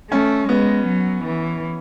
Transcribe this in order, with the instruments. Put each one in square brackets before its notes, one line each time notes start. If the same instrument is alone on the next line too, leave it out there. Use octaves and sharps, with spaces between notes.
[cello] A3 [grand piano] C#4
[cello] G#3 [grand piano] B3
[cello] F#3
E3